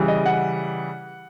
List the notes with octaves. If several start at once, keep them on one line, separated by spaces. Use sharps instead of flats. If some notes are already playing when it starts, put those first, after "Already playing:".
Already playing: C#3 E3 G3
D#5
F#5